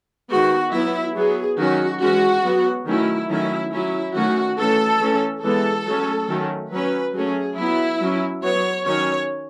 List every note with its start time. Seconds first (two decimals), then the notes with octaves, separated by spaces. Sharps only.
0.29 D#3 G#3 B3 F#4
0.72 F#3 B3 E4
1.15 F#3 B3 G#4
1.58 D#3 F#3 C#4 F#4
2.01 E3 G#3 C#4 F#4
2.44 F#3 B3
2.86 D#3 F#3 A3 C#4 E4
3.29 D#3 F#3 A3 C#4 E4
3.72 F#3 C#4 E4
4.14 D#3 F#3 A3 C#4 F#4
4.58 E3 A3 C#4 A4
5.00 E3 A3 C#4
5.43 E3 G#3 B3 A4
5.86 F#3 A3 C#4
6.29 D#3 F#3 A3 C#4
6.71 F#3 C#4 B4
7.14 F#3 A3 C#4 G#4
7.57 F#3 B3 E4
8.00 F#3 C#4
8.42 F#3 B3 C#5
8.85 D#3 F#3 C#4 C#5